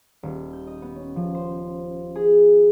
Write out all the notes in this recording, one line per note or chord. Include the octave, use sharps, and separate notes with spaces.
D#1
G6
D#5
B3
C#4
F3
C5
G#4